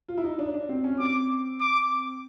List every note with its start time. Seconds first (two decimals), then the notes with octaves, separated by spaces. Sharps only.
0.08 F4
0.18 E4
0.24 D#4
0.39 D4
0.54 D4
0.69 C4
0.84 C#4
1.00 C4 D6
1.61 D6